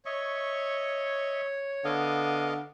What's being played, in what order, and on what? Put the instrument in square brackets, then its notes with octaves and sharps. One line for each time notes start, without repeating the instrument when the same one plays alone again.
[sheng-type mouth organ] C#5 [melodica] D#5 E5 C#6
[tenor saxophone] D3 [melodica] B3 D#5 F5